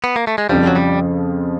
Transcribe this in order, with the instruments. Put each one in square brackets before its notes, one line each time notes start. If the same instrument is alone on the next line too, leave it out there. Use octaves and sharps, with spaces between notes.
[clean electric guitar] B3
A#3
A3
G#3
[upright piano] F2 C#3 F3 [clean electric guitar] G3
[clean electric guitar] F#3
G3